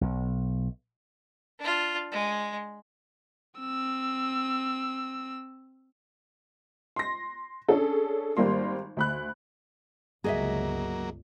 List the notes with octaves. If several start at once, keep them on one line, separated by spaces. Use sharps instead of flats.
B1
D4 F4
G#3
C4 E6
C6 A#6
C#4 D4 G#4 A4
G#1 G3 A#3 C6
D2 B5 F#6
G1 C#2 F#3 A#3 G#4 D#5 E5